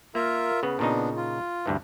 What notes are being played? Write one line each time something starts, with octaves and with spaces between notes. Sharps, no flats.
A#3 F4 A#4 E5
C#3 B3
A#2 C#3 B3 D4 D#4
F4
D2 G2 E3